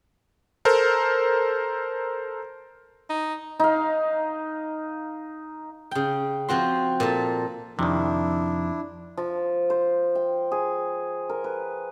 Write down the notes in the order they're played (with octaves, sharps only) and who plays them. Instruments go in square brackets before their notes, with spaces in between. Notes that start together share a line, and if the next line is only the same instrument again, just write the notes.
[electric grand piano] A4 A#4 C5
[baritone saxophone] D#4
[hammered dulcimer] D#4 F5
[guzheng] C#3 G5
F3 C4 F#4 C6
A#2 A4
[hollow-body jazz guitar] F2 [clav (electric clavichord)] C3 D#3 [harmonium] D4 E4
[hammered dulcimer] F3
C5
G5
G#4
A#4
B4